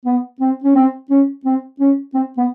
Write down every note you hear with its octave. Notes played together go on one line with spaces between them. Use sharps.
B3
C4
C#4
C4
C#4
C4
C#4
C4
B3